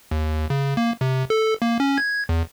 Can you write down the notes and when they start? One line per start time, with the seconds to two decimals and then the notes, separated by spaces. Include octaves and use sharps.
0.11 D#2
0.50 C#3
0.77 A#3
1.01 C3
1.30 A4
1.62 A#3
1.80 C#4
1.98 G#6
2.29 E2